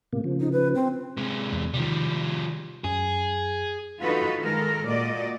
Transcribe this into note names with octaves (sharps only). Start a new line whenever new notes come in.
A2 C3 A#3
C#3 F3
D#4
B4
C4
C3 G#3
E1 E2
C3 D#3 F3 G3
F#2 G#4
E3 D#4 F4 F#4 A4 B4
D#3 G#3 A4 A#4
A#2 F#4 D5 D#5